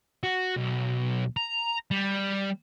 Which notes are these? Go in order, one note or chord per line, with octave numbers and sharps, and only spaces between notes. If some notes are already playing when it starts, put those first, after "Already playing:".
F#4
B1
A#5
G3